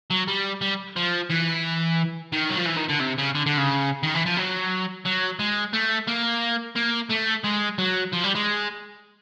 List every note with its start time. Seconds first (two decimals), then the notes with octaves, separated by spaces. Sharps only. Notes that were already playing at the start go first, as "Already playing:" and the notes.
0.10 F#3
0.28 G3
0.61 G3
0.96 F3
1.30 E3
2.33 D#3
2.50 F#3
2.58 F3
2.67 E3
2.78 D#3
2.89 D3
3.01 C3
3.18 C#3
3.35 D3
3.46 D3
3.58 C#3
4.03 D#3
4.14 E3
4.26 F3
4.37 F#3
5.05 F#3
5.39 G#3
5.73 A3
6.08 A#3
6.76 A#3
7.10 A3
7.44 G#3
7.78 F#3
8.12 F3
8.24 G3
8.35 G#3